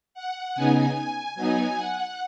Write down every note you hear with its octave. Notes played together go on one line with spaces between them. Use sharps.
F#5
C#3 B3 D#4 G#5
F#3 B3 D#4 G#5
F#5